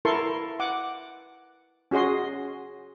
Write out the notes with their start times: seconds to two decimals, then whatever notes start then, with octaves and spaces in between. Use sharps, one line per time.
0.05 E4 A4 A#4 A5 C6 C#6
0.60 F#5 D6
1.91 C#4 F#4 G#4 D#5 C6